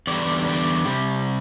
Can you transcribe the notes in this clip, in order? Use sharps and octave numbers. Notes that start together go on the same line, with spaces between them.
E2 D3 G3 D5
D5
C3 G3